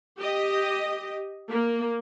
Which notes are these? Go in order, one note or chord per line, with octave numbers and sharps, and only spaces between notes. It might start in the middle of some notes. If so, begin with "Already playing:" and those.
G4 D#5
A#3